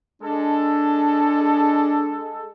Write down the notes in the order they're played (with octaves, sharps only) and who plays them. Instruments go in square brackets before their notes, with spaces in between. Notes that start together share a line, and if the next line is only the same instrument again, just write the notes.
[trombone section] G#3 A4 [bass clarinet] D4